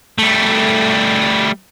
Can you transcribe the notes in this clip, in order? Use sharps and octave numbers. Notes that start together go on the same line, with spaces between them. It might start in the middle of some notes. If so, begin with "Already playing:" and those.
G3 A3